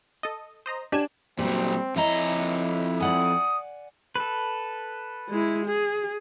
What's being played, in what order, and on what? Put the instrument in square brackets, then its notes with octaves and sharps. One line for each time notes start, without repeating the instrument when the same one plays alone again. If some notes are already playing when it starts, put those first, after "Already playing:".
[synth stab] A4 D#5
C5 D#5 A#5
[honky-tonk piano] D4 [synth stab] G4 G#5 E7
[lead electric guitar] A#2 F#3 [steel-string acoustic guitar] G3 [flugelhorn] C4
[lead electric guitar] F2 A#5 [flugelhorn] E4 [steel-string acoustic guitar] C#5 D#5
[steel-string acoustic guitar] D5 F#5 G#5 [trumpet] D#6
[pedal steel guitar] A4 B4
[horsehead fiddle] G#3 E4
G#4